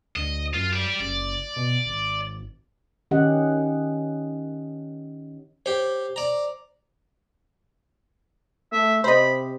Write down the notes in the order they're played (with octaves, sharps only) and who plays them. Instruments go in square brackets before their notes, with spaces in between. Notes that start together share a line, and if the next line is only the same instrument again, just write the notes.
[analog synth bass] D2 [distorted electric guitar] D#5
[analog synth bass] F#2 [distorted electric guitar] F4
[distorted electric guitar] G4 D5
[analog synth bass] F#1 [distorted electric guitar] D5
[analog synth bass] B2
G#1
[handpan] D#3 C#4 G4 D#5 F#5
[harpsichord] G4 C#5 [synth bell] C5
[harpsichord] D5 A#5
[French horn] A3 [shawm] E5
[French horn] C3 [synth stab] C5 D#5 [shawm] B5